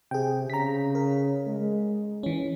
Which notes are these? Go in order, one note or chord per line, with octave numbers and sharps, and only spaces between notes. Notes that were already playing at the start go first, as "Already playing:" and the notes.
C3 G#4 G5
C#3 A#5 B6
A#4
G#3
E3 C#4